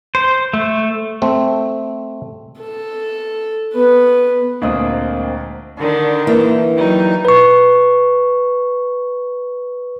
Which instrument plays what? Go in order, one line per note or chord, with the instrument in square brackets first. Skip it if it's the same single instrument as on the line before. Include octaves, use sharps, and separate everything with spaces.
[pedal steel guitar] C5
A3
[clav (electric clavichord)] A3 C4
[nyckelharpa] A4
B3 B4
[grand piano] D2 A#2 D#6 [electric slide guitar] G#3 A#3 C4 [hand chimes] D4 D#5
[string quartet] D3 D#3 D4
[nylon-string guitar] E3 A#3 E4
[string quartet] F#3 G3 D#4
[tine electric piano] B4 C#6